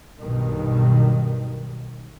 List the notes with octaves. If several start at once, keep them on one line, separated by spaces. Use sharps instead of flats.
B1 G2 B2 D#3